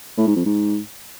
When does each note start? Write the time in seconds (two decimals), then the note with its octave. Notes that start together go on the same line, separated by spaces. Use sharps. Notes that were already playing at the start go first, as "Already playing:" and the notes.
0.18 A2
0.27 G#2
0.36 F2
0.45 G#2